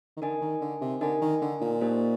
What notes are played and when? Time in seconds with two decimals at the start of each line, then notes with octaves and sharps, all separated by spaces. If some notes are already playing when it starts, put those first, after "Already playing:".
0.17 D#3
0.22 D3 D#4 A#4 D#5 G#5
0.42 D#3
0.61 D3
0.82 C3
1.01 D3 D#4 A#4 D#5 G#5
1.22 D#3
1.42 D3
1.61 A#2
1.81 A#3 D#4 G4 C5 D#5